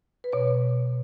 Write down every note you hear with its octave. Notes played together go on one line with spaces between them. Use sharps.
B4
B2 C#5